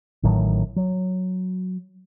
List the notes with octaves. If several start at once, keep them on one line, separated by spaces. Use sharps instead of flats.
A1 A2 D#3 F#3
F#3